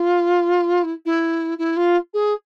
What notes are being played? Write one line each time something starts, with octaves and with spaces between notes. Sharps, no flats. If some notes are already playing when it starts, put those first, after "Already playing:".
Already playing: F4
E4
E4
E4
F4
G#4